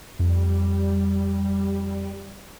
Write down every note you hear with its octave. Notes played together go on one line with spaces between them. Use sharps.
F2 G3